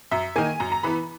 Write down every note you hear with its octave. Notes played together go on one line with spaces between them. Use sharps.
F#2 E5
D#3 A#3 G#5
F#2 A#5
A#5
E3 B3 B5